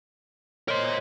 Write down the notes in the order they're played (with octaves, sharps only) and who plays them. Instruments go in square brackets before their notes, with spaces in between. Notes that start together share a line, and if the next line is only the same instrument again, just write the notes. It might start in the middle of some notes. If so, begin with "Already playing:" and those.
[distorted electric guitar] A#4 C6 [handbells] C5 C#5 D#5